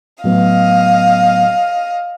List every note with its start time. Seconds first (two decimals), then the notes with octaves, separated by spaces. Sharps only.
0.24 A2 F#3 B3 D#5 F5